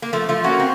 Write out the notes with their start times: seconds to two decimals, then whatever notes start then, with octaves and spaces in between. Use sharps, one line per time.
0.02 A#3
0.13 F3 A3
0.28 F3 A3 F4
0.44 A#3 C#4 F#4
0.60 C4